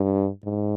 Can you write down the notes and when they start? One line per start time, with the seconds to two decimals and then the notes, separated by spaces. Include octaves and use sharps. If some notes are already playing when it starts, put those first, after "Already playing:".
Already playing: G2
0.44 G#2